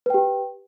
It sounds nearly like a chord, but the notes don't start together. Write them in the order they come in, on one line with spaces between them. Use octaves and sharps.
B4 G5 G4